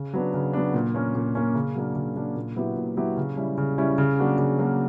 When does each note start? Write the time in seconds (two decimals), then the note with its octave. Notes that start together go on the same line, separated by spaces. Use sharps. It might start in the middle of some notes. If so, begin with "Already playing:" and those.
Already playing: C#3
0.13 F#3 B3 D4
0.34 C#3
0.53 F#3 B3 D4
0.74 A#2
0.94 A#3 C#4
1.15 A#2
1.35 A#3 C#4
1.55 C#3
1.75 F#3 A#3 D4
1.95 C#3
2.16 F#3 A#3 D4
2.36 A#2
2.56 F#3 B3 E4 G4
2.77 A#2
2.97 F#3 B3 E4 G4
3.17 C#3
3.37 G3 C#4 E4
3.58 C#3
3.78 G3 C#4 E4
3.98 C#3
4.19 F#3 A#3 D4 F#4
4.38 C#3
4.59 F#3 A#3 D4 F#4